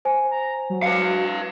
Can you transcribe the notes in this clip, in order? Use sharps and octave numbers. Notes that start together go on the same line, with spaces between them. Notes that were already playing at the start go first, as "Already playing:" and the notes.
C5 G#5
A#5
F#3
B4 F5 C#7